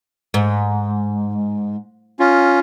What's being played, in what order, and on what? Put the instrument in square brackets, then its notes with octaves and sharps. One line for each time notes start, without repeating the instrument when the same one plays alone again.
[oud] G#2
[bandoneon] C#4 F4